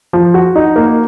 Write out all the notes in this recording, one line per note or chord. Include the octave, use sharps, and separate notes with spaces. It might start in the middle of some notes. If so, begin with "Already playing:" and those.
F3
F#4
D#4
A#3